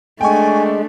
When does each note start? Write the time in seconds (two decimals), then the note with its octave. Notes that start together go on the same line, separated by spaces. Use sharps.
0.21 G#3 A3 D4 G5 G#5 C#6